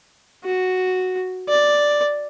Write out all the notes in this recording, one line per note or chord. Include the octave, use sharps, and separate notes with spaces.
F#4
D5